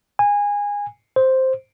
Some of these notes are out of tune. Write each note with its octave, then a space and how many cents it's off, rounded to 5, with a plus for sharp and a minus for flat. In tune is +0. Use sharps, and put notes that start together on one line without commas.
G#5 -20
C5 +0